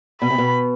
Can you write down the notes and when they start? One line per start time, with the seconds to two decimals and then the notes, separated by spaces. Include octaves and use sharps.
0.21 B2 B5
0.30 C3
0.38 B2